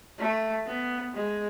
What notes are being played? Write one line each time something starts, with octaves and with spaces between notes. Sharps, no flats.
A3
B3
G#3